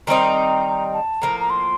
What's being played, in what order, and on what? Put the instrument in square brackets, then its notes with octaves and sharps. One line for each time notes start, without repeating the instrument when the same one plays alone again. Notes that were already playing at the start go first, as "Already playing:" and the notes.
[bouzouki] D#3 G3 C4 D#4 [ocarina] A#5
[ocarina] A5
[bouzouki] A2 F3 A#3 [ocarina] A#5
[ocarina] A#5
C6